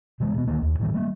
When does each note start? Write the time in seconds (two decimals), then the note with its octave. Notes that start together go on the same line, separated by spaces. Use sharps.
0.20 C3 E3 G#3
0.34 B2 B3
0.48 D2 D3 D#3 A#3
0.62 D#2
0.80 A2 D3 E3 G3
0.94 G3 A3 A#3